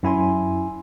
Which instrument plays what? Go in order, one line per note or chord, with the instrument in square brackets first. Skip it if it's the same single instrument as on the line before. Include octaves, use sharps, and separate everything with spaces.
[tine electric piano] F#2 E4 G#5 C6